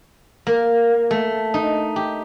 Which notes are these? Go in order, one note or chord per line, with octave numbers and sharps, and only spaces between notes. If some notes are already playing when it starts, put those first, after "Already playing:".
A#3
A3
D#4
G4